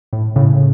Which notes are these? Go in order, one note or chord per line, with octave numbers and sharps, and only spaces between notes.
A2
A2 C#3